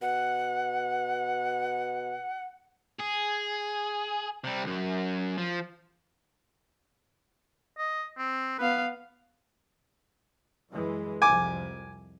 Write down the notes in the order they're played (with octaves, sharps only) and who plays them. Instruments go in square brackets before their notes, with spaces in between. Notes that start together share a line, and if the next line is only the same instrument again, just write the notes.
[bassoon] B2 [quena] F#5
[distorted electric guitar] G#4
C3 G3
C#2 F#2
F3
[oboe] D#5
C4
[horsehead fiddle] B3 F5 [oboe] B4
[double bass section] F#2 E3 G#3
[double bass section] C2 F2 C3 [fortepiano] G#5 D6